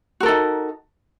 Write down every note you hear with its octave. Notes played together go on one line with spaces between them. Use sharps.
D#4 F#4 A4 A#4